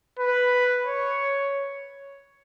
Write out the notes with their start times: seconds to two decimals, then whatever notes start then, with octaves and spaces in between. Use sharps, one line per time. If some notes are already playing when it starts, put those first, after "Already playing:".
0.19 B4
0.86 C#5